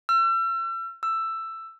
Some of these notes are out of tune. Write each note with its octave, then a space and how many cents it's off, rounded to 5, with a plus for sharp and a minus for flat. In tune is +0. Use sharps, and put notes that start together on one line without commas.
E6 +40
E6 +10